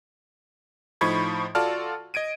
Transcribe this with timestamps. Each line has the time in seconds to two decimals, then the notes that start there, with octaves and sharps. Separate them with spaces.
1.01 A2 F3 D#4 B5 C#6 G#6
1.55 F4 F#4 A4 D5 A5 F6
2.14 D#5 G#6 D7 D#7